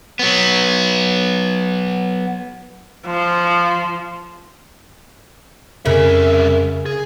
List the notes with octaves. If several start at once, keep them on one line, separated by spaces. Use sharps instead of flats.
F#3 B3
F3
C2 F2 C#3 A#4 E5
G#4